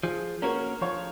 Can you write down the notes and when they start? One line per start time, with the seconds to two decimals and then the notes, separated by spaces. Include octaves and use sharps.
0.03 F3 G#4
0.42 A#3 C#4 F#4 A#4 C#5
0.81 F3 C#5